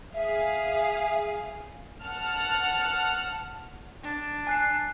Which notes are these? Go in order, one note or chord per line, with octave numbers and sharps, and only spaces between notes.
G#4 E5 F5
F#5 A5 F6
D4
G#5 F#6 C7